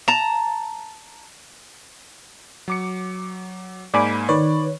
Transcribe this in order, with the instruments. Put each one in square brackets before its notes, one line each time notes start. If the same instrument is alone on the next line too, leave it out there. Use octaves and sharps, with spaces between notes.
[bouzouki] A5 A#5
[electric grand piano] F#3 D6 C#7
[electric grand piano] G#2 A#3 G#5 [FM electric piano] D5 B5 D6
[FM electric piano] D#3 B4 C#5 [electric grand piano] D5